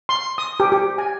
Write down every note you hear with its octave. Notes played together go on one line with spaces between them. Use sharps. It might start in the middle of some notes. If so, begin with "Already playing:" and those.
C6
D#6
G4
G4
G#5